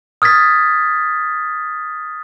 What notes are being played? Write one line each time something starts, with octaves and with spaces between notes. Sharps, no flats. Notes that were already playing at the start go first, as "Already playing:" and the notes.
D#6 F6 G#6 A6 B6